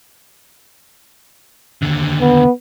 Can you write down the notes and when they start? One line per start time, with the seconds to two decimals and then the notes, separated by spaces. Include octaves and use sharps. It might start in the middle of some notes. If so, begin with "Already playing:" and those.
1.82 D#2 D3
2.21 B3